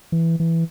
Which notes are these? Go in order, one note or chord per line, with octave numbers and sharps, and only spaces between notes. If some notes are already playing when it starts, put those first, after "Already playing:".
E3
E3